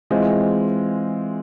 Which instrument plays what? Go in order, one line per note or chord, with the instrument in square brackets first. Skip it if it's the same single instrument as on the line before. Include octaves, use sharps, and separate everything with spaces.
[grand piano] E3 G#3 C4 F4